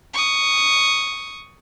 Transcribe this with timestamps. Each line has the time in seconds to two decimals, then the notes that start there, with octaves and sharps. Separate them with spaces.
0.13 C#6 D#6